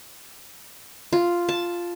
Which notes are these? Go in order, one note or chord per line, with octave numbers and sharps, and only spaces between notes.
F4
A5